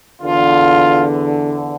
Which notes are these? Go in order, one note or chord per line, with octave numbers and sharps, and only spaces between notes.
E2 D3 F4